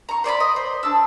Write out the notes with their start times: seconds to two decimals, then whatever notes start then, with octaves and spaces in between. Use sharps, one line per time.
0.09 A#5 C#6
0.24 C5 D5 G#5 B5
0.40 D#5
0.56 C5
0.83 D4 A5 E6